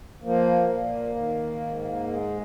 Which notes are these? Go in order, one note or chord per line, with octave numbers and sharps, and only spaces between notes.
F3 A#3
A#2
D#3
G#2
G#3